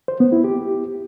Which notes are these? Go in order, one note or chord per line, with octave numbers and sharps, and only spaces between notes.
C5
B3
E4
G4